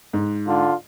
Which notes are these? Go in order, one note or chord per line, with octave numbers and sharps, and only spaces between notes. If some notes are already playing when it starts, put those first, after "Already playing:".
G#2
D3 F4